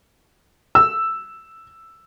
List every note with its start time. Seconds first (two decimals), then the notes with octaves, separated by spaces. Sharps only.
0.75 E6